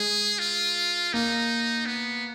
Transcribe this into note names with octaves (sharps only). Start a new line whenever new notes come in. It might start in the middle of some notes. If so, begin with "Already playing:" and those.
Already playing: G#3 G#4
F4
A#3 D#4
B3